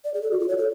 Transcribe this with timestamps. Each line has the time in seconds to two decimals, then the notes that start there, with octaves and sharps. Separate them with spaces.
0.04 D5
0.14 G#4
0.22 A4
0.31 F#4
0.40 F4
0.48 C#5
0.58 A4